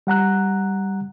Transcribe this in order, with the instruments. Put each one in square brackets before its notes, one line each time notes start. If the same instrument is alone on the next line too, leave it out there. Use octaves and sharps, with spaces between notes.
[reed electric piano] G3 F#5 A#5 F#6